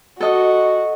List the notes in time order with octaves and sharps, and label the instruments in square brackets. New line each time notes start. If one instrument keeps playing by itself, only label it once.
[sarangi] F#4 [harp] A4 D#5